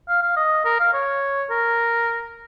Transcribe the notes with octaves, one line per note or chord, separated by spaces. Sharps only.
F5
F5
D#5
A#4
F5
C#5
A#4